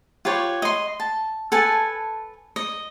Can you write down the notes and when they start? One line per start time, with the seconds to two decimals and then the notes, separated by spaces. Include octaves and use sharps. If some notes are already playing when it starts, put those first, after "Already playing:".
0.25 F4 G4 B4 C#5
0.62 D#5 C6
1.00 A5
1.52 A4 B4 G#5 A5
2.56 D#5